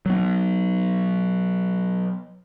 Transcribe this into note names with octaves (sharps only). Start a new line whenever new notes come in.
F#3 B3